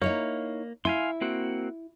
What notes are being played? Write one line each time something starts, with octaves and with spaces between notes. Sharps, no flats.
A#3 D#4 E4 C#5
E4 F5 G#5 C6
A#3 C4 F#4